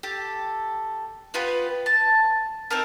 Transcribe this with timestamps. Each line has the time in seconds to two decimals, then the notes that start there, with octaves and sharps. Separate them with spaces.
0.03 G4 A4
1.34 B3 F4 G4 B4
1.86 A5
2.70 C4 D#4 A4 A#4